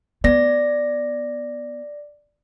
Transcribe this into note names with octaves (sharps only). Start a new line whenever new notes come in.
B3 D5 A#6